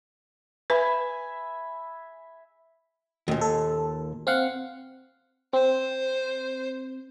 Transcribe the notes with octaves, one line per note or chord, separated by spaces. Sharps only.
B4 E5 G#5 B5
D#2 A#2
A4
C4 F5 F#5
C4 C5